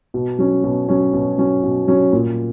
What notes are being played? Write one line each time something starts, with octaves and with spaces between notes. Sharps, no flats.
B2
F#3 C#4
B2
F#3 C#4
B2
F#3 C#4
B2
F#3 C#4
A#2